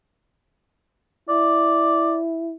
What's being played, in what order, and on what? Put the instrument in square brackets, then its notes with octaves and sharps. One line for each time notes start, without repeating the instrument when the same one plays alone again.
[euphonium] E4 [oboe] D5